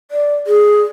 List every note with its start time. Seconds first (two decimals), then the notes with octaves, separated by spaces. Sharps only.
0.11 D5
0.47 G#4